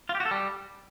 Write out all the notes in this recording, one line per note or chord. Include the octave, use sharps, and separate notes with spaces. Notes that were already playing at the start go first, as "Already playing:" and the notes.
F4
G4
F#4
A4
G3